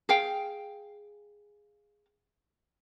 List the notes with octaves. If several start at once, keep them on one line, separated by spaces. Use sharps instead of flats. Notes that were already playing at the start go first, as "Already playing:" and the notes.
G#4 F5 G5